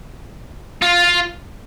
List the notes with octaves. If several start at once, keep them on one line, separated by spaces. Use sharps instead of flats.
F4